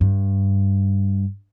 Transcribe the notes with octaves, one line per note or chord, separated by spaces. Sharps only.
G2